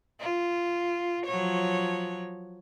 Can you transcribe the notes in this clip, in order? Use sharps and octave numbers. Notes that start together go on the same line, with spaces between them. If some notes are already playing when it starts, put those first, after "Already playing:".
F4
F3 F#3 C#5